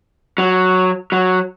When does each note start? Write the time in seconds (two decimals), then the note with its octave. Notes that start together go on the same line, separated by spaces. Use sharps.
0.38 F#3
1.12 F#3